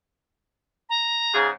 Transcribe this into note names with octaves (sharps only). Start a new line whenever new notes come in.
A#5
G#2 C#3 G#4